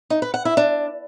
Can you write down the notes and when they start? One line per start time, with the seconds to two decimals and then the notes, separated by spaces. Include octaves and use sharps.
0.10 D#4
0.22 B4
0.34 F#5
0.45 E4
0.57 D4